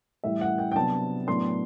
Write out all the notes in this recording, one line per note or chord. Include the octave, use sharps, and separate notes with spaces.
A2 E3 G3 E5
F#5
G5
G5
C3 F#3 B3 D4 A5
A2 F#3 B3 D4 C6